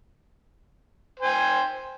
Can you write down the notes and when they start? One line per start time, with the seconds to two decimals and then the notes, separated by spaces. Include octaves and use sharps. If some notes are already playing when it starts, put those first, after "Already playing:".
1.20 C5
1.22 G#5
1.25 G5